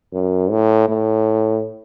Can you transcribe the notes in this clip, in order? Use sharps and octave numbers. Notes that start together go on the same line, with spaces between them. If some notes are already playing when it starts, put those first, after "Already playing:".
F#2
A2
A2